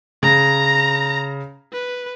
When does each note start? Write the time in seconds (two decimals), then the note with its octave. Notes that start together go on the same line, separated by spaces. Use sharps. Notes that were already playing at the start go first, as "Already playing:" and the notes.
0.23 C#3 A#5 A#6
1.73 B4